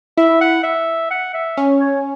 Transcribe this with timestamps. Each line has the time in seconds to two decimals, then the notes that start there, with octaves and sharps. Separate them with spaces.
0.17 E4 E5
0.41 F#5
0.63 E5
1.11 F#5
1.34 E5
1.57 C#4
1.80 C#5